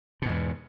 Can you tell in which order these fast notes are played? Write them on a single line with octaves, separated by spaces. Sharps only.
B2 G#2 E2